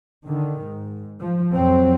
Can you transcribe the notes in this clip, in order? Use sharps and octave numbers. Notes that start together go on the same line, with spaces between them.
D3 D#3
G#2
F3
F2 F#3 C4